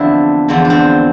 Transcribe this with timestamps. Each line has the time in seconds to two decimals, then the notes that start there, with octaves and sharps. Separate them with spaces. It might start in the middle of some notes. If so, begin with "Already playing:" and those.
Already playing: E2 D3 F3 C4 D4 E4
0.48 E2 D3 F3 C4
0.65 D4
0.70 C4